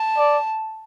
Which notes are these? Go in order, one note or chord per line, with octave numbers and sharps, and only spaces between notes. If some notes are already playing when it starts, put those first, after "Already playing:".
Already playing: A5
D5